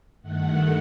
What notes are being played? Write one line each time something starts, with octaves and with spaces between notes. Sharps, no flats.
G2 D#3 A3 F#5